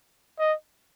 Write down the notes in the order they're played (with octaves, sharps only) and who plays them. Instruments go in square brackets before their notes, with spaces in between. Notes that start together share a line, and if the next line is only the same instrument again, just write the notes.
[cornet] D#5